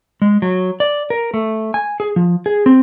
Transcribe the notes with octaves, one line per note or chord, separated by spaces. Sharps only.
G#3
F#3
D5
A#4
A3
G#5
G#4
F3
G#4
C4